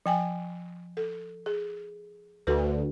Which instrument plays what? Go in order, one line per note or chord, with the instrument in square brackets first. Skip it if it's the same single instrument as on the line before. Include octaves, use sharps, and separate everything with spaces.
[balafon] F3 G5 G#5
A4
G#4
[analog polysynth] D2 [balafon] F#4 A4 B4